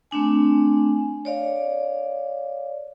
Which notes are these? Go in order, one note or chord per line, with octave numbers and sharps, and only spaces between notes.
A3 C4 D4 G#5
C#5 D5 F5